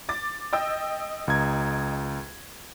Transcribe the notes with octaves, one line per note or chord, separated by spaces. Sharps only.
D6 A6
D#5 G5 E6
C#2 A#5 G#6